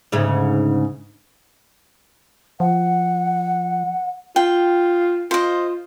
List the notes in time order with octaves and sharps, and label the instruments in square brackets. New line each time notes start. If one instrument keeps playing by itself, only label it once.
[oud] D2 G#2 C#3
[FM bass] F3 [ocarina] F#5
[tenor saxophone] F4 [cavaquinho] G5
[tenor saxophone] F4 [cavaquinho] C5 D#5